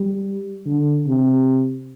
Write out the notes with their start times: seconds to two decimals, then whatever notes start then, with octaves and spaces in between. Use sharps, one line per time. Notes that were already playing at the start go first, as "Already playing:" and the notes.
Already playing: G3
0.66 D3
1.07 C3